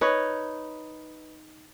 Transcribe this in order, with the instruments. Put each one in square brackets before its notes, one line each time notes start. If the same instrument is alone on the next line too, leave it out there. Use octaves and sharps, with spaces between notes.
[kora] D#4 B4 C#5